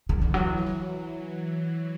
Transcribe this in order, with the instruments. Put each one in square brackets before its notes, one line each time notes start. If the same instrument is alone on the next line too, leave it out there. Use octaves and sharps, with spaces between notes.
[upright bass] D3
[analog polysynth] D3 [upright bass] E3
[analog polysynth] E3 [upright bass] F#3
[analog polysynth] E3
F#3